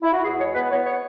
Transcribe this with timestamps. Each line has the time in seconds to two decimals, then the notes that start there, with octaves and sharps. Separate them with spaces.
0.03 E4
0.13 F#4
0.23 E2 G#4
0.39 G#3 C#5
0.55 B3 B4
0.71 B3 C#5
0.86 C#5